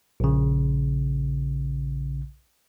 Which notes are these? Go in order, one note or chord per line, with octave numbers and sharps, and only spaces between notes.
A#1 C#3